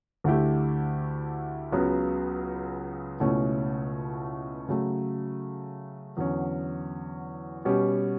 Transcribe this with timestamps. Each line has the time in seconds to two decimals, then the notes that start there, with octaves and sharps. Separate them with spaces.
0.24 D2 D3 A3 E4 G4
1.72 C#2 C#3 F#3 B3
3.20 C#2 B2 A3 C#4 E4
4.68 C#3 F#3 A3
6.17 E2 D3 F#3 C#4
7.65 B2 G3 C#4 G4